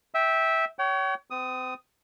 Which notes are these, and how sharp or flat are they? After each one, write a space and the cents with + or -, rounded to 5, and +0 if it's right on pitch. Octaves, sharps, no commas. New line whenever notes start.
E5 -15 G5 +0
C#5 +20 G5 -45
C4 -35 D#6 +5